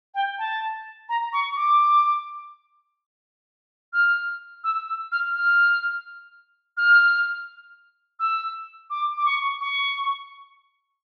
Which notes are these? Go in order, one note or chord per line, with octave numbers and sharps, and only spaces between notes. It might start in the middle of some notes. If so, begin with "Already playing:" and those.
G5
A5
A#5
C#6
D6
F6
E6
E6
F6
F6
F6
E6
D6
D6
C#6
C#6